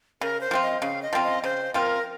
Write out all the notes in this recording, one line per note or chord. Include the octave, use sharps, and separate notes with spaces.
C#3 A#4
C5
F3 C4 F4
D#5
C#3 F5
D#5
F3 C4 F4
D#5
C#3 C5
F3 C4 F4 A#4 C5